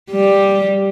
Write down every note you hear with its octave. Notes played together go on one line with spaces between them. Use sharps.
G3